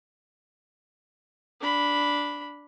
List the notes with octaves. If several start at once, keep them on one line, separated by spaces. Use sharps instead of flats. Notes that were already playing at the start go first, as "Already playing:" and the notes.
D4 B5